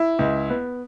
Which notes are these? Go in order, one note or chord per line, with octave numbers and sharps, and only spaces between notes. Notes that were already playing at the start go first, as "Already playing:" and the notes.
Already playing: E4
C#2
B3